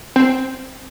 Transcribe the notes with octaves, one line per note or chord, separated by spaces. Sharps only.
C4